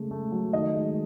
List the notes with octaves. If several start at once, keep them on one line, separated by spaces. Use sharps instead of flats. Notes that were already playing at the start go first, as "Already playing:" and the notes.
Already playing: C#3 G#3 A3
A3
F#3
D#3 D#5
G#3